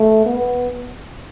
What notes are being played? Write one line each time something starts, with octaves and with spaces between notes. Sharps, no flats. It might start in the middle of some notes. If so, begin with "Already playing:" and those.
Already playing: A3
B3